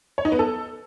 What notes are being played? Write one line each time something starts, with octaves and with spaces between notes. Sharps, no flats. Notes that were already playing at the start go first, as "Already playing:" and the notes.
C#5
D#4
B3
A4